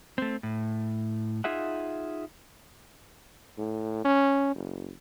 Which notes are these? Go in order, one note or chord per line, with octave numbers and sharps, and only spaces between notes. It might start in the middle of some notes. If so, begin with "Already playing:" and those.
A3 C4
A2
D#4 F4 G#4 E5 F#5
A2
C#4
F#1